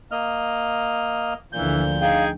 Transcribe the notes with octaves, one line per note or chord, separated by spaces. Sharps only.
A#3 D#5 F6
D2 A#2 D3 E3 F3 G6
D#4 G#4 F5 G5